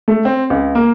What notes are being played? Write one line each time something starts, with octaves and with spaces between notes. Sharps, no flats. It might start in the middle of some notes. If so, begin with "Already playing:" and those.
A3
C4
C#2
A#3